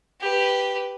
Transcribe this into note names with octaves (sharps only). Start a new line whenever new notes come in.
G4 B4